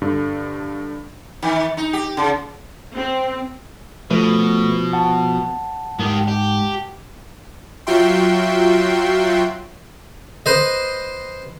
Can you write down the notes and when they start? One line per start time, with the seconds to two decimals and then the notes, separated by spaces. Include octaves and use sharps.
0.02 G2 D3
1.43 D#3
1.77 D#4
1.93 G4
2.17 C#3
2.95 C4
4.11 B2 F3 A3 B4
4.93 F#5 A5
5.99 G#2 D#3 G4
6.28 G4
7.87 F#3 F4 F#4 E5 G5 C6
10.46 B4 C5 D#5